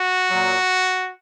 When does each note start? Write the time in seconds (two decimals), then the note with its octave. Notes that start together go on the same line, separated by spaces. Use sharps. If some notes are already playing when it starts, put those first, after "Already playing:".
Already playing: F#4
0.29 A#2 F#3